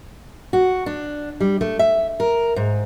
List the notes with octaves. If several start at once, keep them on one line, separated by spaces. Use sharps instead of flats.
F#4
D4
G3
A3
E5
A#4
G#2